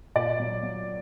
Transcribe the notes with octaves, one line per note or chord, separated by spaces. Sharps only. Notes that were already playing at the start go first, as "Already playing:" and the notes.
A#2 D5
F#3
F#3